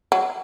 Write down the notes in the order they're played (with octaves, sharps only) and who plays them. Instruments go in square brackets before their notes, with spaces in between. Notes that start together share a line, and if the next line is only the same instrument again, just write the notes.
[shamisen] F#3